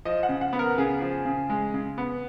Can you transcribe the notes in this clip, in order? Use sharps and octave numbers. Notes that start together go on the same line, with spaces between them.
F3 D#5
F#5
C#3
F#5
B3
A#4
C#3 G#4
F3
C#3
G#3
C#3
B3